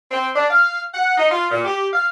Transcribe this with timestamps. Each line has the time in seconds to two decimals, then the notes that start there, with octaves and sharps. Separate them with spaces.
0.12 C4
0.35 D4
0.50 F5
0.94 F#5
1.17 D#4
1.30 F4
1.51 A#2
1.65 G4
1.93 F5